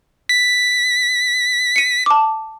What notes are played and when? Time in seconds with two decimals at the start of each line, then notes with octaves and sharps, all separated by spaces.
0.29 B6
1.76 C#7 D#7
2.06 A5 D6